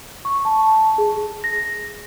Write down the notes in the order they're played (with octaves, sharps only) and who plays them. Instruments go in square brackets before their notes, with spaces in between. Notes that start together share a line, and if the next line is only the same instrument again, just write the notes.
[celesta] C#6
A5
G#4
A#6